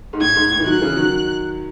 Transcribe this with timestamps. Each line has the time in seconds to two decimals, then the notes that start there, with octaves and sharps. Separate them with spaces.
0.13 G#2
0.20 A2 G#6
0.36 G#2
0.51 A2
0.60 E3
0.66 D#3 F#3 F#6
0.82 C#3 E3
0.96 D#3 F#3